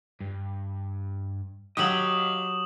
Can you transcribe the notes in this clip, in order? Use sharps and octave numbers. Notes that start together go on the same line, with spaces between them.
G2
F#3 F#4 G4 D#5 F5 D#6 E7 F#7